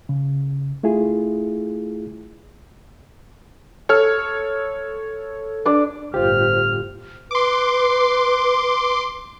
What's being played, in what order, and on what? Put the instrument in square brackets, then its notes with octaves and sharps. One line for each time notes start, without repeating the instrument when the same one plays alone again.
[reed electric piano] C#3
A3 E4 F4 G#4
[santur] A4 [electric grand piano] C#5 F6
[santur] D4 D5
[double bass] G1 A2 [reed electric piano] F4 G4 [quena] C5 [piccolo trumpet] F6
[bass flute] B4 [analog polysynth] C6 D6